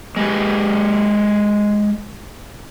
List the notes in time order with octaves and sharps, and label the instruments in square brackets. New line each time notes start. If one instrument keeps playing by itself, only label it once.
[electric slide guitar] G#3 G4 B4